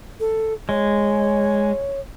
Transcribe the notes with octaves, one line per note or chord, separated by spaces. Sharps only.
A4
G#3 C#5